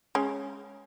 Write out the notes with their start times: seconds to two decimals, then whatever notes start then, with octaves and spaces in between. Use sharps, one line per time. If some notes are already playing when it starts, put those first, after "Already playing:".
0.15 G#3 C#4